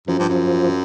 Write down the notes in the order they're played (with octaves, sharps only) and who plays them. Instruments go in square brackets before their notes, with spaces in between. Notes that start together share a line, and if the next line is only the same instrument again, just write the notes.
[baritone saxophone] F#2 [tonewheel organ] F3
[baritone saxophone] G2
F#2